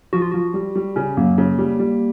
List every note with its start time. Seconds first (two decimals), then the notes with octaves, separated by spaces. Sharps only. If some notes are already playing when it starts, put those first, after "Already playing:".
0.13 F3 F#4
0.22 F4
0.32 F3 F#4
0.54 G3
0.75 G3
0.96 C#3 C#4
1.17 F#2 A#3
1.38 C#3
1.58 G3
1.79 G3